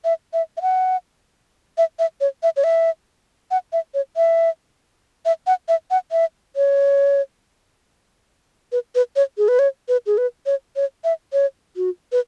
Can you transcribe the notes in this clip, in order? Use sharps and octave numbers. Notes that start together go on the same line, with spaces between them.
E5
E5
E5
F#5
E5
E5
C#5
E5
C#5
E5
F#5
E5
C#5
E5
E5
F#5
E5
F#5
E5
C#5
B4
B4
C#5
G#4
B4
C#5
B4
G#4
B4
C#5
C#5
E5
C#5
F#4
B4